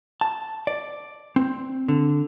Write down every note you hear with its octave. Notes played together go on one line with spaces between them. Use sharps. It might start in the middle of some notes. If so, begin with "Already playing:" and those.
A5
D5
C4
D3